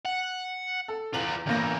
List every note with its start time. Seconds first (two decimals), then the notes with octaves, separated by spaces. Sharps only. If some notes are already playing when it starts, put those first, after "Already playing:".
0.05 F#5
0.88 A4
1.14 E2 F4 B4 F#7
1.47 G1 E2 A2 A#3 A#6